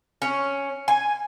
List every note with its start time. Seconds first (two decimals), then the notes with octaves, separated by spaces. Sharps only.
0.22 C#4
0.88 G#5